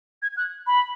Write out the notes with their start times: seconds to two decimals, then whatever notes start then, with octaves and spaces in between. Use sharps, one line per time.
0.22 G#6
0.37 F#6
0.67 B5